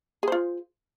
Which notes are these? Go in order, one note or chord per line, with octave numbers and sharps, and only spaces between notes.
F4 G#4 C5